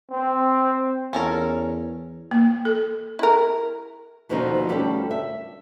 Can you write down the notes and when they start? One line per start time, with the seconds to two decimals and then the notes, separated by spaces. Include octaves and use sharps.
0.11 C4
1.13 E2 C#4 A4 A#4
2.31 A#3
2.65 A4
3.19 E4 A#4
4.29 D#2 B2 D3 F3 C4 D#4
4.69 D2 G3 C#4 D4 A4 G5
5.11 E5